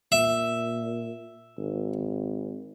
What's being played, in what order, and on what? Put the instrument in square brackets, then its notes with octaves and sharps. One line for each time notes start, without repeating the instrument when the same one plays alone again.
[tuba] A#2 [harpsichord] E5
[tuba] G#1